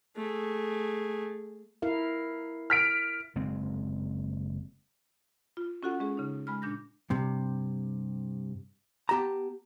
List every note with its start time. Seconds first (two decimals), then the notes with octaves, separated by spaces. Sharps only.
0.16 A3 G#4
1.82 E4 A#4 F5
2.70 F6 B6 D7
3.35 F#1 G#3 C4
5.57 F4
5.83 C#4 F4 F#4 A4 F#5
6.00 G#3 C#4 G#4
6.17 C#3 D#4
6.47 G#3 B5 F6
6.62 A#2 D4 G6 A#6
7.10 G2 C3
9.09 B3 G4 A5 A#5